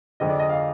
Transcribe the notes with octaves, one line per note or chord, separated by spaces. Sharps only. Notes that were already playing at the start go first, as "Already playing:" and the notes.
F2 D3 F3 G#3 D#5
D5
D#5
F5
D#5